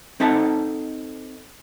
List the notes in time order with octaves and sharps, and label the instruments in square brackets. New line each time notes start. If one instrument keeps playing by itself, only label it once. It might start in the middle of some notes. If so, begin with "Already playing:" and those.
[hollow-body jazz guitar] C4 D#4 A4 E5 F#5 A5